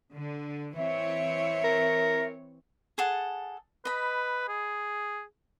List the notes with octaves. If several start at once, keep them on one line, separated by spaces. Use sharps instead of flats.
D3
E3 C4 C#5 E5
A#4
G#4 A4 F#5
B4 D#5 B5
G#4